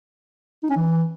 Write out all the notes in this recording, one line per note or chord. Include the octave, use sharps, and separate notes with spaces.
D#4
C#4
E3